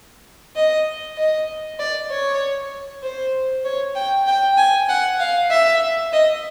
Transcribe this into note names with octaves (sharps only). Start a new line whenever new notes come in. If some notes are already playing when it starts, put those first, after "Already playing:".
D#5
D#5
D5
C#5
C5
C#5
G5
G5
G#5
F#5
F5
E5
D#5